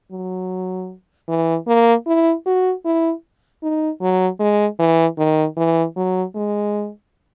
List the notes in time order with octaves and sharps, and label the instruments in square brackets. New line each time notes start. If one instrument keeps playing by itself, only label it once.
[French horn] F#3
E3
A#3
E4
F#4
E4
D#4
F#3
G#3
E3
D#3
E3
F#3
G#3